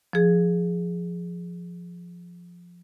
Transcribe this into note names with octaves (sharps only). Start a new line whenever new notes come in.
F3 G#4